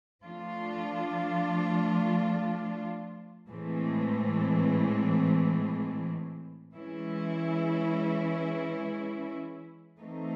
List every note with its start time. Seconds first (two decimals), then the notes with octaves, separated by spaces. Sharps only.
0.24 F3 A3 D4 F4
3.49 A2 E3 G#3 C4
6.74 E3 G#3 C#4 E4
10.00 E3 A3 C4 D#4